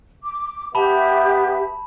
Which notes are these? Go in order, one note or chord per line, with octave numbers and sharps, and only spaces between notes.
D6
B3 G4 E5 A5 B5